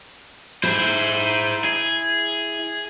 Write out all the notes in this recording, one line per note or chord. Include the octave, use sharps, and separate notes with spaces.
E4 G#4 C5
G#4